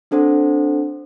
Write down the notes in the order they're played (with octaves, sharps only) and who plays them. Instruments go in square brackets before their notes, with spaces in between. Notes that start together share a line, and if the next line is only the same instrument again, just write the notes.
[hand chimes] C4 D4 A4 C5 F#5